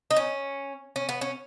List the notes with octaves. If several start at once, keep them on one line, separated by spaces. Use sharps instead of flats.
D#4
C#4
C#4
B3
C#4